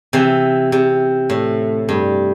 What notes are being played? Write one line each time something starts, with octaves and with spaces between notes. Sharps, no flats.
C3 E3
C3
A2
G2